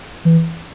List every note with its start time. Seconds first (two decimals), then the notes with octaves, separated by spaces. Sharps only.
0.25 E3